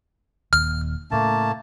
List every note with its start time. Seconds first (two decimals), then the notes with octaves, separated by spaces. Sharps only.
0.53 D#1 D#2 F6
1.11 A2 C#3 A3 A#3 A5